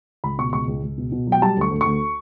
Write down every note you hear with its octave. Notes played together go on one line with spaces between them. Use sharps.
C#2 B5
B2 C#6
C#2 C#6
C#2
C#2
B2
B2
F#3
G5
G3 A5
D2 C#6
D2
D2 C#6